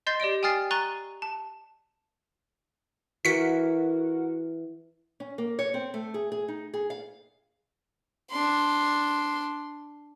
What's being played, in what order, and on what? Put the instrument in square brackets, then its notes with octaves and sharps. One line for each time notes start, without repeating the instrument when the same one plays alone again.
[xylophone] D#5 C6 G6 A6 C7
G4 D5 D#5 D7
G5 G#5 D#6 F6 A6 C7
A#5 C#6 F#6 A6 D#7 G7
A5
[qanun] E3 [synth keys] F#4 A#4 F#5 [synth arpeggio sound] B6 C#7
[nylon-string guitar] C#4
A#3
C#5
C4
A3
G#4
G#4
D#4
G#4
F5
[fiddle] D4 C6